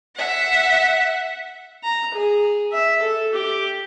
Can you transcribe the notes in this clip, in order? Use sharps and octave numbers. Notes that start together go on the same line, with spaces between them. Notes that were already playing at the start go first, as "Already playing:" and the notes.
E5 F#5
A#5
G#4
E5
A4
G4